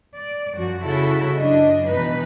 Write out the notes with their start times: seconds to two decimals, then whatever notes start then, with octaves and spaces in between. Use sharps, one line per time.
0.15 D5
0.55 F#2 F3 F#4
0.84 C#3 E4 F#4 A4
1.40 F#2 D4 D#5
1.88 B2 E3 D#4 B4